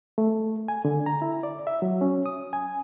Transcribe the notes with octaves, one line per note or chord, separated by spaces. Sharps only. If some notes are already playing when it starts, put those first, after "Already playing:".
A3
G#5
D3
A#5
E4
D5
E5
F#3
C#4
D#6
G#5